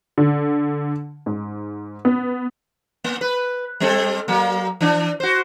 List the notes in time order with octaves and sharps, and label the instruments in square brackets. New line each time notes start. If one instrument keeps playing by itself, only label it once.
[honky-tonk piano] D3
G#2
B3
[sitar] A#3
B4
G3 C4 A4
F#3 A#3
E3 D4
F#4 C5